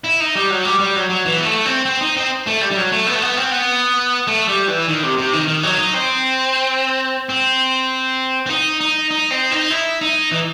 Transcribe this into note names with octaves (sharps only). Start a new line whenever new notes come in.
E4
D#4
G3
F#3
G3
G3
F#3
F#3
E3
B3
A3
C4
C4
D#4
C4
A3
G3
G3
F#3
A3
B3
A3
B3
C4
B3
A3
G3
E3
D#3
C3
C3
D#3
D#3
F#3
D#4
C4
C4
C4
D#4
D#4
D#4
C4
D#4
E4
D#4
E3